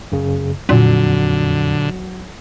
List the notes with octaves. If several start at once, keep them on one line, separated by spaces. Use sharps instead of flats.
F#2 C#3
F2 A#2 D3 F#3